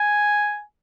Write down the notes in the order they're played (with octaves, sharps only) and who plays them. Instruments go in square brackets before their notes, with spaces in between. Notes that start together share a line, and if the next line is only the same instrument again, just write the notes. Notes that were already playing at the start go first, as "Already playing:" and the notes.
Already playing: [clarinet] G#5